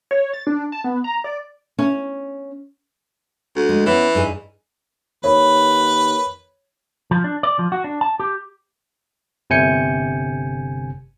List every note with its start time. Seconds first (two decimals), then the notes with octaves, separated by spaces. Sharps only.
0.11 C#5
0.33 A6
0.47 D4
0.72 A5
0.84 B3
1.04 A#5
1.24 D5
1.79 C#4
3.56 D2
3.69 G#3
3.86 E3 B3 C#4
4.15 G2 D#4 G#4
5.24 D#2 A#4 B4 C#5 B5
7.11 F3
7.24 D4
7.43 D5
7.59 F3
7.72 F#4
7.84 D4
8.01 A5
8.20 G4
9.50 G1 C3 G#5 G6 C#7